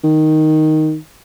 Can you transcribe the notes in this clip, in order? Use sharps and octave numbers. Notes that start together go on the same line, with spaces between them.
D#3